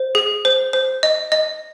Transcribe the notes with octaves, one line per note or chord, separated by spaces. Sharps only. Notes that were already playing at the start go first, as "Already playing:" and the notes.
Already playing: C5
G#4
C5
C5
D#5
D#5